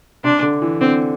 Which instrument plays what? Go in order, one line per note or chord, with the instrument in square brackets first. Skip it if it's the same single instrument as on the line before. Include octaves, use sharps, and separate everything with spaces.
[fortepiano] C3 [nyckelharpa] D4
[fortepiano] D3
E3
[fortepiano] D3 [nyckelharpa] C4